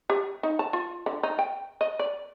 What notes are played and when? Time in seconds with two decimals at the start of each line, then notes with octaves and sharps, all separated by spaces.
0.10 G4
0.43 D#4
0.59 A5
0.73 F4
1.06 D3
1.23 D#4
1.39 G5
1.81 D#5
1.99 D5